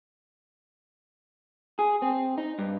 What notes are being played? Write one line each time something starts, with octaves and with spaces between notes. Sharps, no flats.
G#4
C4
D#4
G2